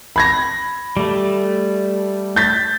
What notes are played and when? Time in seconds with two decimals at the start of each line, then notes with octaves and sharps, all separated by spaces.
0.16 B5 G#6 A#6
0.97 G3 A3
2.36 G6 A6 B6